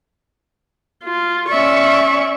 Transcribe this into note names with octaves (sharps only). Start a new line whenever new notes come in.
F4
C#4 D5 E5 C#6